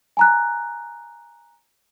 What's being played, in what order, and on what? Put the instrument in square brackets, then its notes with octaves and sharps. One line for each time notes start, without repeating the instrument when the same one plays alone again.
[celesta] G#5 A#5 F#6